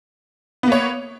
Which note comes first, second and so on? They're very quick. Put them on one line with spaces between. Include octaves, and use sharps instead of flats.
B3 A#3 C#5